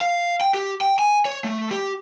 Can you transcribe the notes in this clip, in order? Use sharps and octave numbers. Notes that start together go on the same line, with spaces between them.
F5
G5
G4
G5
G#5
C#5
A3
G4